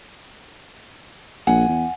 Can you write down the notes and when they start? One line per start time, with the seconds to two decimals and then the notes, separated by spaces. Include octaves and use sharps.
1.47 A#1 F#5 G#5
1.68 E2